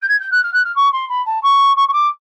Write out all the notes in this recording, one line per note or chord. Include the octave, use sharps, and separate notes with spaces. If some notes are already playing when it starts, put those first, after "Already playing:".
G6
G#6
G6
F#6
F6
F#6
F6
C#6
C6
B5
A5
C#6
C#6
C#6
D6